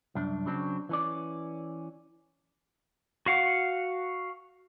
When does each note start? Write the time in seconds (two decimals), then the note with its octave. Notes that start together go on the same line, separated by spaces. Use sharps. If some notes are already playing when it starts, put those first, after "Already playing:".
0.15 C2 F#2 D4
0.46 C#3 F#3 C4 D4
0.89 E3 C#4 D5
3.26 F#4 F5 F#5